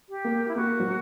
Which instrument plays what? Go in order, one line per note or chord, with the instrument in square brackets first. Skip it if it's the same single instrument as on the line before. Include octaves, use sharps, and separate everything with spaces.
[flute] G4
[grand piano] A#3
[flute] E4
[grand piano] A#3 [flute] F#4
[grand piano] F#3